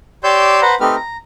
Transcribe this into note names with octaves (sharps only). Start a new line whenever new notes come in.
G4 C#5 D5 C6 E6 G6
B4 C5 F#5 A#5 B5
A3 C4 D#4 G4 B4 F6
A#5